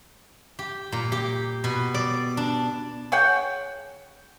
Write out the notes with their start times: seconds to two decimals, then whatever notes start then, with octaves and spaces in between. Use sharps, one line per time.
0.59 G4
0.92 A#2
1.12 G4
1.64 B2
1.94 D5
2.37 D4
3.12 G#4 C#5 F#5 G5